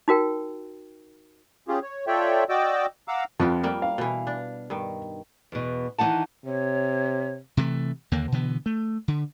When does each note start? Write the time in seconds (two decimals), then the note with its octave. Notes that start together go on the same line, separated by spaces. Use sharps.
0.08 D#4 F#4 A#4 G5
1.68 C#4 F4 G4 G#4
1.82 C#5
2.07 F4 A4 C#5 D5 E5 G5
2.49 F#4 D5 D#5 G5 D6 E6
3.08 F5 F#5 A#5 D6 E6
3.40 F2 F3 B3 G4
3.63 G3 A#3
3.82 F5
3.98 B2 E3
4.27 D4
4.70 G2 D#3
5.52 E2 B2
5.98 D#3 E3 B3 D#4 F#5 A5
6.46 C3 C#5
7.57 C3 E3 F3 A3
8.12 D#2 D3 A#3
8.32 B2 D3 E3 B3
8.66 A3
9.08 D3